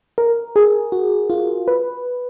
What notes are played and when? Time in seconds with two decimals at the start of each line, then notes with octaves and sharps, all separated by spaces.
0.18 A#4
0.56 G#4
0.92 F#4
1.30 F4
1.68 B4